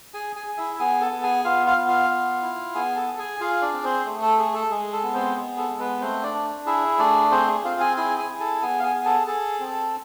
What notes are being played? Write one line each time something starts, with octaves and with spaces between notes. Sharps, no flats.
G#4 G#5
G#4 G#5
G#4
E4 E5
B3 G#4 G#5
A4 A5
B3
G#4 G#5
B3 F4 F5
F4 F5
B3
F4 F5
B3
E4
B3 G#4 G#5
A4 A5
G#4
G#4 G#5
F4 G#4 F5
D4 D5
C4
C4 C5
A3
A4
G#4
A4
G#3 G#4
A4
B3
C4 C5
G#4
A4
G#3
B3 B4
A3 C4 C5
D4 D5
D4
E4 G#4 E5
A3 D4 D5
C4 G#4 C5
G#4
C4 F4 F5
G#4 G#5
E4 G#4 G#5
G#4 G#5
G#4
A4 A5
B3 G#4 G#5
F5
G#4 G#5
G#4
A4 A5
G#4 A4 A5
C4